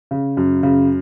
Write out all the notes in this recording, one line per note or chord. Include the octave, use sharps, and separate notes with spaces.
C#3
F#2
C#3